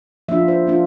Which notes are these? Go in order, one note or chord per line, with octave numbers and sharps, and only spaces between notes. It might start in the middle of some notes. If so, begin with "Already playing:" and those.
F3 A#3 D4 F4 E5
C5
F3 A#3 D4 F4